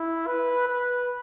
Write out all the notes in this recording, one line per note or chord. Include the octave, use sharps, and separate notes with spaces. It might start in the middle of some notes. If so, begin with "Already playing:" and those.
Already playing: E4
B4
B4